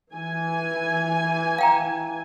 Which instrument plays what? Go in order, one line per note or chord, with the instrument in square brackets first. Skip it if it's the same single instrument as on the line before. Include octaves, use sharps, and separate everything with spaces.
[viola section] E3 G#5
[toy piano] F5 G5 A#5